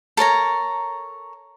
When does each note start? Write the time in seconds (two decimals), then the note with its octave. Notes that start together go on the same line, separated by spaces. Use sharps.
0.17 A4 A#4 C#5 A#5